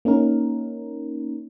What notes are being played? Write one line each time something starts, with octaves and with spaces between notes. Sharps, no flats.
A#3 C#4 D#4 A#4